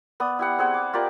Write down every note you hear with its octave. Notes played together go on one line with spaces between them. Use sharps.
B3 D5 D#6
E4 G4 F#5
C4 G#4 F#5
D6
F4 G4 A#4 D5